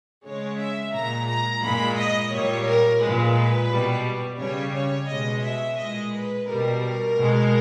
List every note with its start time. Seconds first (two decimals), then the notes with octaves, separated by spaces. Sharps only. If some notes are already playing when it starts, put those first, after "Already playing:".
0.24 C#3 G#3 C#5
0.59 E5
0.93 A#2 G#3 A#5
1.28 A#5
1.63 A#2 G#3 B5
1.97 D#5
2.31 A#2 G3 C#5
2.66 A#4
3.01 G#3 B4
3.06 A#2
3.70 B2 G3
4.39 C#3 G3 C#5
4.74 C#5
5.09 B2 G#3 D#5
5.43 E5
5.78 A#2 G#3 D#5
6.13 B4
6.47 B2 G3 A#4
7.17 B2 G#3